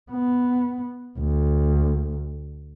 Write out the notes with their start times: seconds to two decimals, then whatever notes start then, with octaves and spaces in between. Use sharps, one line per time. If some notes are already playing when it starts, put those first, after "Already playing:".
0.12 B3
1.19 D2